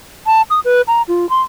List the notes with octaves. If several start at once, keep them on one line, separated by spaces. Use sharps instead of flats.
A5
D#6
B4
A#5
F4
C6